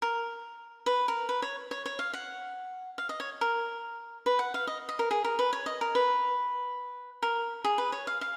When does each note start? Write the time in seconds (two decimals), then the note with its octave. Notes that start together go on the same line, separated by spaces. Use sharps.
0.02 A#4
0.86 B4
1.08 A#4
1.29 B4
1.42 C#5
1.71 C#5
1.86 C#5
1.99 F5
2.13 F#5
2.98 F5
3.09 D#5
3.20 C#5
3.41 A#4
4.26 B4
4.39 F#5
4.54 F5
4.67 D#5
4.89 D#5
4.99 A#4
5.11 G#4
5.24 A#4
5.39 B4
5.53 C#5
5.66 D#5
5.81 A#4
5.95 B4
7.22 A#4
7.64 G#4
7.78 B4
7.92 C#5
8.07 F5
8.21 F5